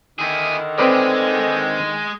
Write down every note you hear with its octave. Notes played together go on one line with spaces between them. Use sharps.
D3 D#3 E4 G#4
G#3 C4 G#4 A4 B4 D5